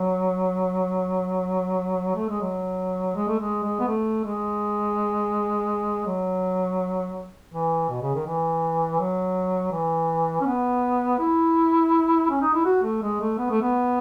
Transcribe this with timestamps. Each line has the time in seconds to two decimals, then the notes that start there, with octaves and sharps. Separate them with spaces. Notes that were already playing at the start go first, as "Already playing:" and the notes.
Already playing: F#3
2.16 A3
2.29 G#3
2.41 F#3
3.15 G#3
3.28 A3
3.39 G#3
3.63 G#3
3.80 B3
3.88 A3
4.25 G#3
6.06 F#3
7.53 E3
7.89 B2
8.02 C#3
8.15 D#3
8.26 E3
9.00 F#3
9.72 E3
10.41 C#4
10.46 B3
11.19 E4
12.30 C#4
12.42 D#4
12.54 E4
12.65 F#4
12.83 A3
13.02 G#3
13.21 A3
13.38 B3
13.50 A3
13.62 B3